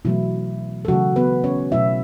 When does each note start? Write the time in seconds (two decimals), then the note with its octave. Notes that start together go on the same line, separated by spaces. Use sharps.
0.05 B2 E3 F#3 A3 E4
0.85 A4
0.88 C#3 E3 F#3 A3 F#4
1.16 B3 B4
1.44 C#4 C#5
1.71 B2 F#3 A3 E4 E5